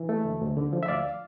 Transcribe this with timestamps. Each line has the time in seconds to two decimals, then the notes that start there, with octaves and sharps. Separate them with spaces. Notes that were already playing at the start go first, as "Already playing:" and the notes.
Already playing: E3
0.09 A3
0.25 D2
0.41 D2
0.57 D3
0.73 F3
0.83 E5
0.88 D2 D5 F5